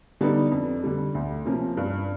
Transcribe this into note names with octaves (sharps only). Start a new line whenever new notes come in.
D3 G3 B3 D#4
F2
D3 G3
D2
C3 F3 A#3 C#4
G2